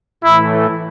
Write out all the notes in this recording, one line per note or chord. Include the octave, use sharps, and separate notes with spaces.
A2 E3 A3 E4